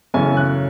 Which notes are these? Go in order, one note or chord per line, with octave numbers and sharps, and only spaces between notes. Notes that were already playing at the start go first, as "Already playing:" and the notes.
F#2 C#3 E3 A3 C#4 G#5
F#6